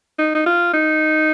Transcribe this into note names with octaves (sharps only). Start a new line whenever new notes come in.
D#4
D#4
F4
D#4